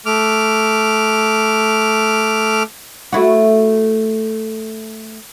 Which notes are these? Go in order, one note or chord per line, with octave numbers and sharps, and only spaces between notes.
A3 D6 F6
A3 E4 F#4